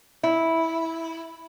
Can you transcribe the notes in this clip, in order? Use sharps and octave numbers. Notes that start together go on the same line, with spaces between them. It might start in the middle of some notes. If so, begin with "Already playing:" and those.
E4